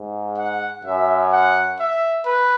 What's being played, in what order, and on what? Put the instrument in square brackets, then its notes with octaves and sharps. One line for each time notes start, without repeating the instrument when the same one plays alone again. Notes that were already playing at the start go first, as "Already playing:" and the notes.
Already playing: [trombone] G#2
[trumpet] F#5
[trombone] F#2 [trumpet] E5
[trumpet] F#5
E5
B4